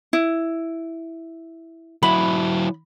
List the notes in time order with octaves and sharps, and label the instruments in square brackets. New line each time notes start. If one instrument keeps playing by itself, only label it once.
[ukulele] E4
[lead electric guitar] F#3 E4 [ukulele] B5